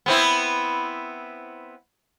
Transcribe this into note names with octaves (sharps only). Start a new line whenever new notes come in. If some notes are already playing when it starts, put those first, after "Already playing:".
B3 C4 E4